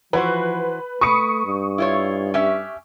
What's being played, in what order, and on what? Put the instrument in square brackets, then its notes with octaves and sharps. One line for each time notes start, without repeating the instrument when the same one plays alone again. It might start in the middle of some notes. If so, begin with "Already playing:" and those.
[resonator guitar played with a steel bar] E3 F#4 C5 [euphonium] F3 [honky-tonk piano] B4
[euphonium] A3 [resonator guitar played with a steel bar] B4 [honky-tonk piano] C#6 D#6 C#7
[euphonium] G2
[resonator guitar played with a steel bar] E4 F4 C#5
C#4 G4 E5